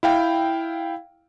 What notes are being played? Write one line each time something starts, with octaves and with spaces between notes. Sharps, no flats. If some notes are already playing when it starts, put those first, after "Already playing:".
E4 F5 G5